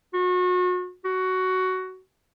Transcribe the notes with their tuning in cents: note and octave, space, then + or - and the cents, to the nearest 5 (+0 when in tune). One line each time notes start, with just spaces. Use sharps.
F#4 -35
F#4 +10